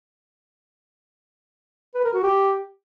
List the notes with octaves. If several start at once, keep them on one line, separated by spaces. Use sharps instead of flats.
B4
A#4
F#4
G4